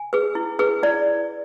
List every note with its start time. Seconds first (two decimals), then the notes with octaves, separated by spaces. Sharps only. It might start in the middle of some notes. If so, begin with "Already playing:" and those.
Already playing: G#5
0.13 G#4 B4
0.35 E4
0.59 G#4 B4
0.83 E4 D5